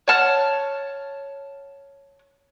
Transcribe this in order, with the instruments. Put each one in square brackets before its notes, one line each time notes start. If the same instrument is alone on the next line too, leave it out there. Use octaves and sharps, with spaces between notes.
[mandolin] C#5 F#5 A5 F6